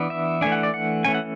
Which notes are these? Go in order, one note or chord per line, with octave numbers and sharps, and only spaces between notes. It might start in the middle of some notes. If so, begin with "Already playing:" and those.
Already playing: E3 B3 D4
E5
E3 A3 D4 G#5
F#5
D5
F#5
E3 A3 C#4 G#5
F#5